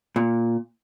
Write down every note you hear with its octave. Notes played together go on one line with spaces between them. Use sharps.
A#2